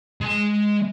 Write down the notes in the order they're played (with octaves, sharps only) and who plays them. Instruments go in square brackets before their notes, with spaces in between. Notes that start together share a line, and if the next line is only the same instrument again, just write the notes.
[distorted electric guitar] G#3 G#5